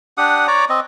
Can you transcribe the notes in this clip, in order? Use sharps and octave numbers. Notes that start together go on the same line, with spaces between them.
D4 G4 F#5 D#6
C#5 D5 A#5 D6
C4 D#5